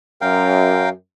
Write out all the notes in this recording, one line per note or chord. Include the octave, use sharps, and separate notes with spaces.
F#2 A#4 F5 G5